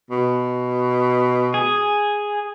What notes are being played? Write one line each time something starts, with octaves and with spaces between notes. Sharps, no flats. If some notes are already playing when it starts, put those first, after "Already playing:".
B2
G#4